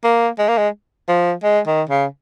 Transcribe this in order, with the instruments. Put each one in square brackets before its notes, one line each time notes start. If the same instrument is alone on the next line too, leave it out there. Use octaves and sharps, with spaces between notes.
[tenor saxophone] A#3
G#3
A#3
G#3
F3
G#3
D#3
C#3